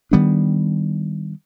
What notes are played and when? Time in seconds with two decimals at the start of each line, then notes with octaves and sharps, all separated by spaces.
0.11 D#3 G3 B3 D4